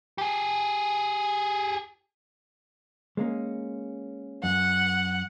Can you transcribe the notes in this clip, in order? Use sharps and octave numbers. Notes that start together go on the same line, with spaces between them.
G4 G#4
G#3 A#3 C#4
F#2 F#5